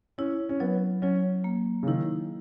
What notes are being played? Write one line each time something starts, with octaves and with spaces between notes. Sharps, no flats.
C#4 E4
C#4
F#3 B3
F#3 C#4
A#3
C#3
D#3 E4